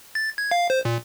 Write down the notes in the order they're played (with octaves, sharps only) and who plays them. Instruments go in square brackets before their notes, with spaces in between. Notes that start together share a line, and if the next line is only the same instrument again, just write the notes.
[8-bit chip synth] A6
G#6
F5
C5
A#2